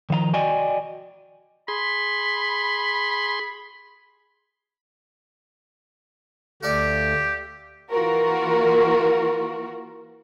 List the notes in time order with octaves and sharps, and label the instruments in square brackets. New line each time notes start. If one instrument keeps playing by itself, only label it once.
[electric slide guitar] D#3 F3 F5 A#5
F#4 D5 D#5 G5 G#5
[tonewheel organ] G#4 C6 [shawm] B5
[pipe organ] D2 A3 [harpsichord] F4 A4 D5 [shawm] G4
[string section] E3 A#3 F4 F#4 A#4